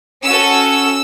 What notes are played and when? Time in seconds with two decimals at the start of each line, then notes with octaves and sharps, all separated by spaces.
0.24 C#4 F#4 A4 E6